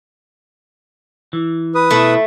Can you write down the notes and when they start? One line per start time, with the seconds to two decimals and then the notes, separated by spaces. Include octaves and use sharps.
1.33 E3
1.75 B4 D#6
1.91 B2 A3 E4